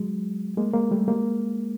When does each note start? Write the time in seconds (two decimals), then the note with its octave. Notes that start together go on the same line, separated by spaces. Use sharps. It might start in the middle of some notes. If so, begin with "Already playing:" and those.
Already playing: F#3 G#3
0.57 G#3 A#3
0.73 G#3 A#3
0.91 G3 A3
1.08 G#3 A#3